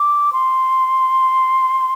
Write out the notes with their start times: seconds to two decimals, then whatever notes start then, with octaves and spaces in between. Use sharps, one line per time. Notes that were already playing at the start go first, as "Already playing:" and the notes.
Already playing: D6
0.33 C6